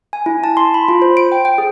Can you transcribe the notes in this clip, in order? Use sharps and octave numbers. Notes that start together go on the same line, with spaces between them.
G#5
E4
A5
C6
B5
F4
C5
D7
G5
G5
G#4